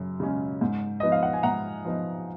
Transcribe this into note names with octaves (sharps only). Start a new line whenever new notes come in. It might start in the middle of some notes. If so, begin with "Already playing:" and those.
Already playing: F#2 C#3
C#3 G#3 C#4
G#2
F3 B3 D#4 D#5
F5
F#5
G#5
G#2 F#5 A#5
F3 B3 D#4